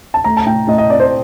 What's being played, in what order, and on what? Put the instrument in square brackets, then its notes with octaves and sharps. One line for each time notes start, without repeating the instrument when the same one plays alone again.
[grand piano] A5
A3 A#5
A5
A2 G5
A2 D#5
D#5
C4 D5
C5